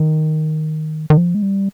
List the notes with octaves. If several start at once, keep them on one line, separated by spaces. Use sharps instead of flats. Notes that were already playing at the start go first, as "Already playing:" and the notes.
Already playing: D#3
D#3
F3
G#3
G3